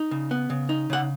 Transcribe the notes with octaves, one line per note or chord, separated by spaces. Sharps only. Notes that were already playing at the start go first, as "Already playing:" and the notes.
Already playing: D#4
C#3
B3
C#3
D#4
C#3 F#5